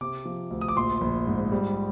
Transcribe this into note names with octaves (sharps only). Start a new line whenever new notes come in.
C3 D6
F3
D2
D#6
D6
A#1 C6
A#1
G#2
G3